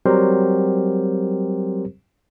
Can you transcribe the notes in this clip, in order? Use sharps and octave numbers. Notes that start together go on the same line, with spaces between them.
F#3 G3 C4 G4 A#4 C5